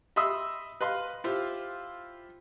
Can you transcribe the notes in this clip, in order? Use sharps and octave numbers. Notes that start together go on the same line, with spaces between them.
D#5 E5 B5 C6 D#6 E6
B4 D#5 F5 C6
E4 F4 G4 C5 F5